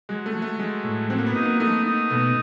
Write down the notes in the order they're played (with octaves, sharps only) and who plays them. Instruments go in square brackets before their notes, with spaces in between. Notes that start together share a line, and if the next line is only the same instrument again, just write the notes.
[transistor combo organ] F#3 [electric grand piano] G#3
[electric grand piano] A3
[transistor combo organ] F#3
[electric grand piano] A3
[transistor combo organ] F#3 [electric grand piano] G#3
[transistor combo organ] A2
[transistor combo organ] F#3 [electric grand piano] C4
[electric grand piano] A#3
B3
[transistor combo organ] D#4
[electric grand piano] A#3
[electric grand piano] A3 [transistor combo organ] D#4
[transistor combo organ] D#4
[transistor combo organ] B2 [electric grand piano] A3